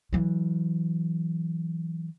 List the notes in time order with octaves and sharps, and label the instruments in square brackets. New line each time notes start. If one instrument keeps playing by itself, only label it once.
[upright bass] E3 F#3